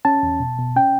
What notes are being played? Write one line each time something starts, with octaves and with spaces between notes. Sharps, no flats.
C#4 A5
E2
B2
B2
C#4 G5